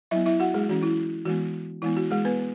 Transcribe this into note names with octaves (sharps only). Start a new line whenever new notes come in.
F#3 B3 E4 E5
E4 E5
F#4 F#5
G#3 G#4
E3 C#4 F#4
E4
E3 G#3 B3 F#4
E3 G#3 B3 E4
F#4
G#3 G#4
B3 B4
B3